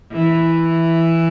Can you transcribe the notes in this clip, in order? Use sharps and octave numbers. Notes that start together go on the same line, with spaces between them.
E3